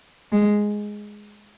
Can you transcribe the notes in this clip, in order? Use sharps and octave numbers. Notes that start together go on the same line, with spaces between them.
G#3